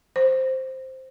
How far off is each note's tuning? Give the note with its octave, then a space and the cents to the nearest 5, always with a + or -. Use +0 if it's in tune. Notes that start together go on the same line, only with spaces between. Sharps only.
C5 +5